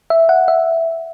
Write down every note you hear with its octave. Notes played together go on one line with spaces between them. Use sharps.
E5
F#5
E5